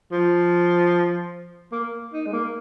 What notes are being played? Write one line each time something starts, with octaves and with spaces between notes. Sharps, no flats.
F3
A#3
D#4
G#3
A#3